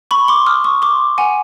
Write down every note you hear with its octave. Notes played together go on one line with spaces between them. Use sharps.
B5 C#6
C6 D6
D#6 F6
C#6 D#6
C6 D6
F#5 G#5